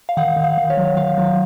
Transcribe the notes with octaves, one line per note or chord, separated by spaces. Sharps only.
F5
D#3 F#5
D#3
F5
D#3
C#5
F#3
D#3 F5
F#3